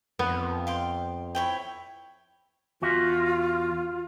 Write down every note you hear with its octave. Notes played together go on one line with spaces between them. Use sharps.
F2 B3
F5 G5 C6
E4 C#5 G5
E2 F4 F#4 E5